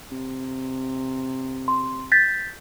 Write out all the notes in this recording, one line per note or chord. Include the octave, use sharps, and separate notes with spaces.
C3
C6
G6 A6 B6